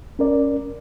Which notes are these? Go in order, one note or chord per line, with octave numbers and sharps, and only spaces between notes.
C#4 A#4 D5